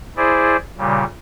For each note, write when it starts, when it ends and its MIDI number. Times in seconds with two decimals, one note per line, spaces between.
0.17 0.57 64
0.17 0.57 68
0.17 0.57 72
0.17 0.57 74
0.78 1.04 46
0.78 1.04 49
0.78 1.04 55